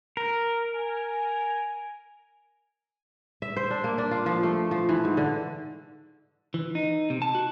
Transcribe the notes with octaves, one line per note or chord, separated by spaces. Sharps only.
A#4
G#5
E5
C5
D4
A#3
D4
F4
F3
A3
F3
E3
G#2
D3
E3
D#4
C3
A5
F#4